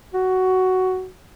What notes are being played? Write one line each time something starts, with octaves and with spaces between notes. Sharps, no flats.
F#4